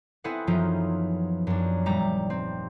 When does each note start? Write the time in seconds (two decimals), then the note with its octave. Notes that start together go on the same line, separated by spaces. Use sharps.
0.24 B3 C4 E4 G#4 A4 F#5
0.47 F#2 E3 F3 B3 D#4 F4
1.47 F#2 D4
1.86 D#1 G3 A#5 D6
2.30 C4